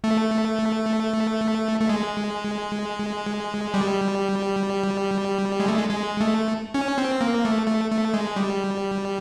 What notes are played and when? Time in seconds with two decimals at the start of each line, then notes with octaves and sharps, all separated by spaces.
0.04 A3
1.81 A3
1.89 G#3
3.74 G3
5.60 G#3
5.68 A3
5.78 G#3
5.89 G#3
6.20 A3
6.74 C#4
6.98 C4
7.21 A#3
7.45 A3
7.67 A3
7.91 A3
8.14 G#3
8.36 G3